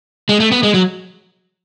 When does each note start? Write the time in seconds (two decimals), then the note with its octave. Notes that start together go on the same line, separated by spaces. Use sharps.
0.29 G#3
0.40 A3
0.52 B3
0.63 G#3
0.74 F#3